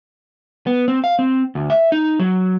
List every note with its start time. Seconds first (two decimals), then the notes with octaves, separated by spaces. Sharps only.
0.67 B3
0.88 C4
1.04 F5
1.19 C4
1.55 D2
1.70 E5
1.92 D#4
2.20 F#3